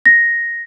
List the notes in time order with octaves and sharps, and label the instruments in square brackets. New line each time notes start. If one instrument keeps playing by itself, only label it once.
[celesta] A#6